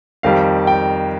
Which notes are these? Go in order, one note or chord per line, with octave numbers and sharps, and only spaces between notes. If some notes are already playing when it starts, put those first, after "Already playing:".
F2 D#3 G3 F5
G5